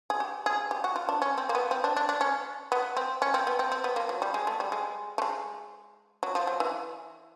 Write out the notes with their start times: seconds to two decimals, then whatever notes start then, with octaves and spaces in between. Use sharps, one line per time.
0.10 G#4
0.20 G4
0.46 G#4
0.71 G4
0.84 F#4
0.96 F4
1.09 D4
1.22 C#4
1.38 C4
1.49 A#3
1.55 B3
1.71 C4
1.84 D4
1.96 D4
2.09 D4
2.21 C#4
2.72 B3
2.97 C4
3.22 C#4
3.34 C4
3.47 B3
3.59 C4
3.72 C4
3.84 B3
3.96 A#3
4.09 F#3
4.22 G3
4.34 G#3
4.47 A3
4.60 G3
4.72 G#3
5.18 A3
5.22 G#3
6.23 F#3
6.35 F3
6.47 F#3
6.60 E3